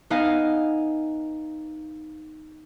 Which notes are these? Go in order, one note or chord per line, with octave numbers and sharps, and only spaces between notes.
B3 D#4 D#5 F5 G#5